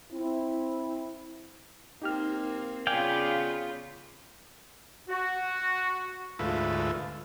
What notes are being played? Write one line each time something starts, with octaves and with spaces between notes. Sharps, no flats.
C4 E4
A#3 C4 D#4 G4 F6
C#3 B3 F4 D5 F5 G5 G#5
F#4
D2 G#2 A3 F4 B4 E5